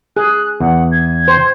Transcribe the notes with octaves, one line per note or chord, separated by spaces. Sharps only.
G#4 F#6
E2 F#5
G#6
C5